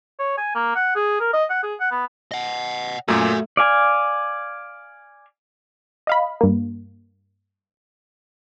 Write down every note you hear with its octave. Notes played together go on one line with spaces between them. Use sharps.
C#5
G#5
A#3
F#5
G#4
A#4
D#5
F#5
G#4
F#5
B3
D#5 F#5
F#2 A#2 A3 F#4 G#5
D5 F5 G#5
D#5 F5 B5
G2 A#3